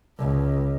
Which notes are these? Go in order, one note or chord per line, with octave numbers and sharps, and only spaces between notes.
C#2